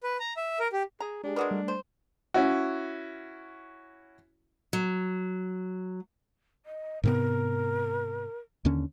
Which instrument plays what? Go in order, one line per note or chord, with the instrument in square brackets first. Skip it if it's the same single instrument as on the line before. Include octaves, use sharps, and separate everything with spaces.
[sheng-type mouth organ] B4
A#5
E5
A#4
G4
[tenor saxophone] G#4 [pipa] A#5
[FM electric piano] G#3 G4 G#4 [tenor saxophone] D4
[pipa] G#3 F#4 A#4 [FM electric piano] B4 D5 D#6
[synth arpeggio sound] G3 [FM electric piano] A3
[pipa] C5
[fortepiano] C#4 E4 F#4
[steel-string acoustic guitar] F#3
[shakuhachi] D#5
[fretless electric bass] G#2 C3 B3 [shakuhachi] A#4
[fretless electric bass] D#2 D3 C#4